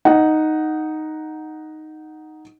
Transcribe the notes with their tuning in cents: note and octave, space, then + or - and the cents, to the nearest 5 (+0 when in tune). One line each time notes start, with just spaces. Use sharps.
D#4 +0 F#5 +0